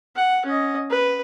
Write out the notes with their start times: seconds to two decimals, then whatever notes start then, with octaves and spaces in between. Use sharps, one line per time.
0.16 F#5
0.45 C#4 D#5
0.91 B4